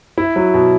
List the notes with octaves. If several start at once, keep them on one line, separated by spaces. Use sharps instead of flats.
E4
F#3
B2